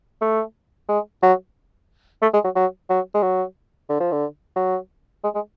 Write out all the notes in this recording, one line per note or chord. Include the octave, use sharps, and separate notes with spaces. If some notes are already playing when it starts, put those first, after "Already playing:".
A3
G#3
F#3
A3
G#3
F#3
F#3
F#3
G#3
F#3
D3
F3
D3
F#3
G#3
G#3